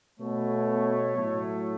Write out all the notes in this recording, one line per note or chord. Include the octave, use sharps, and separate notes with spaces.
B2 A3 C#5
A2 F#3 A3